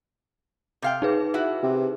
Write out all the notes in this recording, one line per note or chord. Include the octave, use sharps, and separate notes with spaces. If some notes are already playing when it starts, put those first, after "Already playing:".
C3 F5 G5
D#4 G#4 B4
E4 F#4
C3